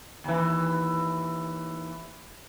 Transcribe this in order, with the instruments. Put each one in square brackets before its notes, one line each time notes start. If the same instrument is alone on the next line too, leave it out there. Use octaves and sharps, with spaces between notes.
[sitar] D#2 E3